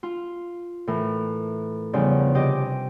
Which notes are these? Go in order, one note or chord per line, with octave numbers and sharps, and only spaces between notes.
F4
A2 E3 A#4
E2 C#3 F3 G3 D4 D#4
C3 G4 D#5 D6